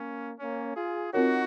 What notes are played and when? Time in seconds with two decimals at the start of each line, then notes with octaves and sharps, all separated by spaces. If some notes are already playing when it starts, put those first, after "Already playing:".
Already playing: A#3 C#4
0.40 A#3 C#4
0.76 F4 G#4
1.13 C4 D#4 F4 F#4 A#4 C#5